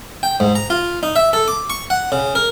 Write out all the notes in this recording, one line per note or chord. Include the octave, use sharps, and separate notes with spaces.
G5
G#2
A#5
F4
D#4
E5
A4
D6
C#6
F#5
C#3
A#4